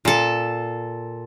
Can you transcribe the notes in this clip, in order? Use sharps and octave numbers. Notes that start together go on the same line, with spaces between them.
A#2 A4